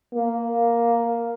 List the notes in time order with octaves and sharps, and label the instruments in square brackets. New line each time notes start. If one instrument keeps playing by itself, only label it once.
[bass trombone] A#3